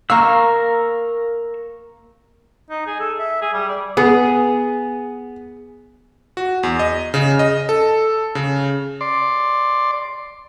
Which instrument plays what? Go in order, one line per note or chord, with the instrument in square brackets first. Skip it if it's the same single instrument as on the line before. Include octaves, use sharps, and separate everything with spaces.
[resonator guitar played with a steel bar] A#3 F5 [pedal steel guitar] A#4 C#6 E6
[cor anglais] D#4
G#4
A4
E5
G#4
G3
D5
[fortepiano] B3 [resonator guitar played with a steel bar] G#4
[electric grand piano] F#4
E2
D#5
C#3
D#5
A4
C#3
[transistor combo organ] D5 C6